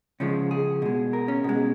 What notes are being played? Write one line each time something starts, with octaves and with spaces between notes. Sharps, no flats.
C#3 F3 G#3 C#4
G#4
B2 G#3
A#4
C#4
B2 G#3